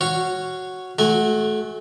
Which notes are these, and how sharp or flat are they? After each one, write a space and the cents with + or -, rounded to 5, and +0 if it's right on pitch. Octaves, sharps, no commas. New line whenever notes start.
F#4 +0 C#5 +0 F5 -20
A3 -30 F#4 +0 G#5 -25